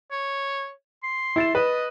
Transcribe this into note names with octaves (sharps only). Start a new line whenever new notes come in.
C#5
C6
E4 A6 E7
B4 D#5